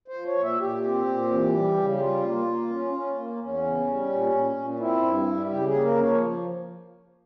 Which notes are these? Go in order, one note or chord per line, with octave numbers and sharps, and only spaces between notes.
C5
F3
C#5
A#2
E5
A#2 G4
C4
A#2
E3
G3
C#3
G4
G3 F4
A#3
A#3
C#4
C#4
A#3
E2 C#4
C#3
G3
A#2
A#2
A#2
C4 E4
G2
G3
C#3 G4
G#4
A#3
A#4
F3 C#5